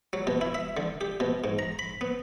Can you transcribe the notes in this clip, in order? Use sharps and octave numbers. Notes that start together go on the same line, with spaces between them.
F#3
B2
E4
E5
D3
G4
B2
G#2
A#5
B5
B3